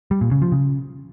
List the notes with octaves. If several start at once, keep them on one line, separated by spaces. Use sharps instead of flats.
G3
A#2
C#3
F3
C#3